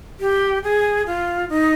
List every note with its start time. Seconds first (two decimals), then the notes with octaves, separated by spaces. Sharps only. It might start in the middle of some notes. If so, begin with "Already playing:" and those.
0.20 G4
0.63 G#4
1.06 F4
1.49 D#4